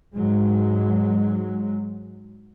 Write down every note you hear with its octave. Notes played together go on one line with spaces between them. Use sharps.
G#2 F#3 G#3